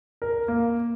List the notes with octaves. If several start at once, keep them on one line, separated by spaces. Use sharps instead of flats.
A#4
A#3